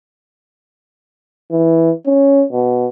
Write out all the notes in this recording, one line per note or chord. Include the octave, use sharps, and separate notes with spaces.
E3
C#4
B2